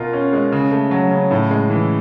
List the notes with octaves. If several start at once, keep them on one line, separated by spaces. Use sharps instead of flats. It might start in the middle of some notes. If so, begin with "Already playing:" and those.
Already playing: B2 F4 A#4
C#4
G#3
C#3
A3
F#3
C#3
A2
G#3
E3